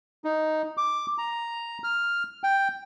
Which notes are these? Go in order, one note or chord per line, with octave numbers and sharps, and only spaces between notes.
D#4
D6
A#5
F6
G5